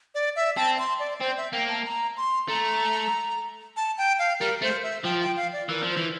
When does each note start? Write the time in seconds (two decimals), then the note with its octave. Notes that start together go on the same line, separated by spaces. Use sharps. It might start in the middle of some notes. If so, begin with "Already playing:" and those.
0.15 D5
0.36 E5
0.56 C4 A5
0.79 C6
0.99 D5
1.21 C4 C5
1.37 E5
1.53 A#3 G5
1.68 A5
1.85 A#5
2.17 C6
2.48 A3 A#5
3.77 A5
3.98 G5
4.19 F5
4.40 G3 A#4
4.62 A3 C5
4.83 E5
5.04 F3 G5
5.21 G5
5.36 F5
5.53 D5
5.69 E3 A#4
5.83 F3
5.90 C5
5.96 E3